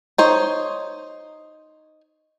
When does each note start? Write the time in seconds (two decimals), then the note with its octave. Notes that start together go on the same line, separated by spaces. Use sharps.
0.18 D#4 C5 C#5